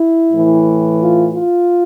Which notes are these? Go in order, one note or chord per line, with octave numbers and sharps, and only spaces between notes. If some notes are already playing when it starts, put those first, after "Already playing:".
Already playing: E4
A2 E3
F4
F4